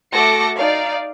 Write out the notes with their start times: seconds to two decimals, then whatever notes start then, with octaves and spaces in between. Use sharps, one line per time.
0.11 A3 F#4 A4 D6 A#6 C#7
0.57 D#4 D5 F5